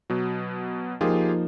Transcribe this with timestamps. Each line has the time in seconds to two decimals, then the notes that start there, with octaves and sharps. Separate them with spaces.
0.10 B2 F#3
1.01 F3 A#3 D#4 F4 G4 G#4